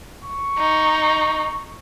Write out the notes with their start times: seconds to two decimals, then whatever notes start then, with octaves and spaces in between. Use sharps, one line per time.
0.24 C#6
0.58 D#4